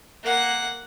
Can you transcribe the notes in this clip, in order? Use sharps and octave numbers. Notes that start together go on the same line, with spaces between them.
A#3 F#5